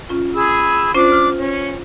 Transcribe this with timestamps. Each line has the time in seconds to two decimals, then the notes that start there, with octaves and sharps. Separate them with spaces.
0.09 C#4 F4
0.34 G#4 B5 E6
0.95 C#4 D4 F4 C5 D6
1.12 F6
1.37 C#4